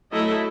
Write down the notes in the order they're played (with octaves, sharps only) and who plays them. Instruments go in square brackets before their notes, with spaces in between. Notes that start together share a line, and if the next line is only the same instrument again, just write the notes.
[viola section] F#3 A3 E4 A4 D#5